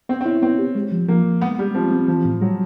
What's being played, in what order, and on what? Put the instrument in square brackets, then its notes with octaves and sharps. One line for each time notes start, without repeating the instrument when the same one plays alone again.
[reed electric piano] B3 [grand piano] C4
[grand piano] C4
[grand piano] C#4 [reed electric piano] E4
[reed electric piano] B3 [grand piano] C4
[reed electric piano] G4
G#3
F3
[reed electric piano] F3 [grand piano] A#3
[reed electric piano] F3
[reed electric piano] G#3 [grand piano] B3
[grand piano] G3 [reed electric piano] G#3
[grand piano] F3 [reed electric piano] C4
[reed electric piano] C4
[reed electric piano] E3 [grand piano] F3
[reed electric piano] A2
[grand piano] F#3 [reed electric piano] G3